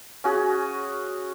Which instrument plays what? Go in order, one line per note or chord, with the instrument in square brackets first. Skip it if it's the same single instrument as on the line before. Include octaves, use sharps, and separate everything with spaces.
[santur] C#4 F#4 G#4